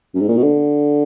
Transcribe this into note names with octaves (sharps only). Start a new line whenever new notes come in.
F#2
G#2
A#2
B2
D3